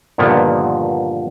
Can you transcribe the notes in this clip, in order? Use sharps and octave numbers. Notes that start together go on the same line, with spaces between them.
G2 A#2 D3 D#3 F3 B3